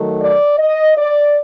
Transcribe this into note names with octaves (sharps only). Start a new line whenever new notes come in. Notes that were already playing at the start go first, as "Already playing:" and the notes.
Already playing: D#3 F#3 A3
D5
D#5
D5